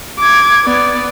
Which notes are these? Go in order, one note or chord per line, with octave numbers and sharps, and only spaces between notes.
D6 G#6
B3 D5